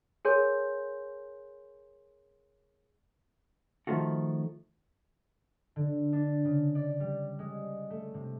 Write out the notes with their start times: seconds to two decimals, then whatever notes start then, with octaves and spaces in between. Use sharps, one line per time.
0.25 G#4 A#4 C#5 G#5 C6 G6
3.87 D#3 F3 A3 F4 F#4
5.76 D3
6.13 D4
6.45 C#3
6.75 D5
7.00 G3
7.39 G#3
7.90 A3
8.14 C3